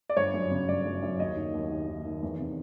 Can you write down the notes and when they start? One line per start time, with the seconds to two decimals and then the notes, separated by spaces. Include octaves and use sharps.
0.10 D5
0.17 G1 C#5
0.34 F#2
0.51 C#3
0.68 G1 D5
0.85 F#2
1.02 F#2
1.19 D#2 D#5
1.36 D#3
1.54 D#2
1.71 D#2
1.88 D#3
2.06 D#3
2.23 E2
2.39 C3